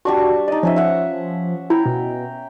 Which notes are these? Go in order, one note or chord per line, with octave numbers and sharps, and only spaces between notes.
G3 D4 F#4 C#6
D#4 D5 D#5
F3 C#4 D#4 E5
E5 F#5
E4 G5 A#5
B2